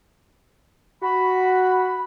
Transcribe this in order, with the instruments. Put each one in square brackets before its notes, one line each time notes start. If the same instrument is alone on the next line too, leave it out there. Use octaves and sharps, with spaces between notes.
[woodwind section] F#4 B5